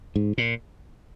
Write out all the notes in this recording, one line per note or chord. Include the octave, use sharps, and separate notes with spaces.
G#2
A#2